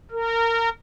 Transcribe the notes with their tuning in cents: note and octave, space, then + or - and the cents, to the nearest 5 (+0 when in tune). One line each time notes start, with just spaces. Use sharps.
A#4 -25